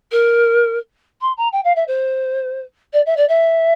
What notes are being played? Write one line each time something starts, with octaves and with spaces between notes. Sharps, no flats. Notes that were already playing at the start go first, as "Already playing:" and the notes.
A#4
C6
A#5
G5
F5
E5
C5
D5
E5
D5
E5